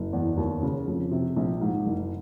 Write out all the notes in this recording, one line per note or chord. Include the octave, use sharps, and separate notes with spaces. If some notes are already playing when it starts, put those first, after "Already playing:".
Already playing: F#1
E2
D#2
C#3
F2
C3
A#1
G#2
F#1